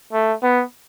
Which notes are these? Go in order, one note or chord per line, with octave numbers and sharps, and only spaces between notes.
A3
B3